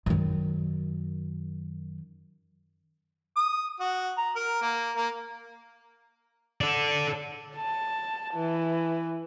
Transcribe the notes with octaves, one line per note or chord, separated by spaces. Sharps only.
F#2 D#3
D#6
F#4
A#5
A#4
A#3
A#3
A4 D5
A5
E3